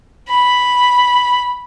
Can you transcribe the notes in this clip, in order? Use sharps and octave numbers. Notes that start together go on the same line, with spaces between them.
B5